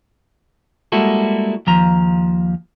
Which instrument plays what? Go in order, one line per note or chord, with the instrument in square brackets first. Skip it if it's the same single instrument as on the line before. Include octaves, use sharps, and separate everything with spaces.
[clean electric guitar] G3 G#3 A#3 E4 F#4 A4
D#2 F3 A#5